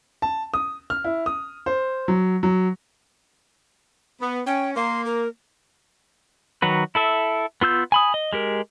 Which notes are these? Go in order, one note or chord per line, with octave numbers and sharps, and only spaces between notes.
A5
D#6
F6
E4
D#6
C5
F#3
F#3
B3
C#4 G5
A#3 C6
A#4
D#3 F#3 F#4 B4
E4 A4 E5
B3 F4 E6 G6
G#5 B5 D#6
D#5
G#3 G4 A#4